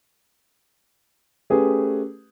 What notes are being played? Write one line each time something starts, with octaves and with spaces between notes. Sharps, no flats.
A3 C#4 G4 G#4 B4